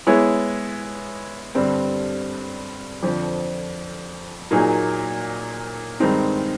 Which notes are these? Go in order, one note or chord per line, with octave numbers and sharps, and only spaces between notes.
G#3 B3 E4 G#4 C#5
G2 D3 G3 C4
F2 D3 F3
A#2 F#3 A#3 D#4 G#4
G2 D#3 G#3 C4 D#4